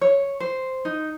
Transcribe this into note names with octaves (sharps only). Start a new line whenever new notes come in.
C#5
C5
D#4